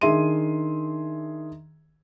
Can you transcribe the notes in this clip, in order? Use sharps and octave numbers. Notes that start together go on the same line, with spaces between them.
D#3 D4 G#4 E5 C6 D#7